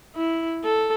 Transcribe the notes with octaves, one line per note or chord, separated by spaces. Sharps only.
E4
A4